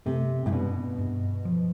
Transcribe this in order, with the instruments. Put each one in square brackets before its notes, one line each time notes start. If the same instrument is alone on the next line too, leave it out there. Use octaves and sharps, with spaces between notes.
[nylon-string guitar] C3 [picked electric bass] A3
[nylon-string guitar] A2
[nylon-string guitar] B2 [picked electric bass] D4
[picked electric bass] G2
F3